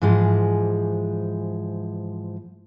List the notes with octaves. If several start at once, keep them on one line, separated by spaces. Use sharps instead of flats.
G#2 E3 F3 G#3